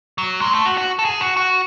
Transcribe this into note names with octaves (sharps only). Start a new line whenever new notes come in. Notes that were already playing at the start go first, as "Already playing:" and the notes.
F#3
G#3
A3
F#4
F#4
A4
G#4
F#4
F#4